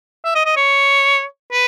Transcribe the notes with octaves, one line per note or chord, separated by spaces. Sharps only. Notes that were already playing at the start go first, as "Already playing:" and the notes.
E5
D#5
D#5
C#5
B4